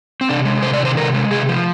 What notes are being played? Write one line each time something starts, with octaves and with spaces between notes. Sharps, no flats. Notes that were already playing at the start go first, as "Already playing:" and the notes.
C4
C3 D4
G#3
C3 C5
D5
D#3
C5
C3 A#4
G#3
C3 G#4
F3